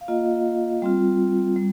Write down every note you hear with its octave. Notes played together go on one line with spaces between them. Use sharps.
F5
A#3 F4 D#5
G3 C4 F4
G3